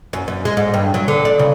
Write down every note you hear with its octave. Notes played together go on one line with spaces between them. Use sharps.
F#2
F#2
G#3
G#2
G2
F#3
D3
D5
C#3